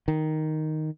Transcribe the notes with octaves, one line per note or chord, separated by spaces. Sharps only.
D#3